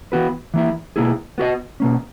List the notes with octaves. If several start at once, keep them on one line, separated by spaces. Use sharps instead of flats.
E3 B3 F#4 B4
E3 A#3 E4
B2 A#3 E4 G#4
B3 F#4 B4 D#5
B2 A#3 C#4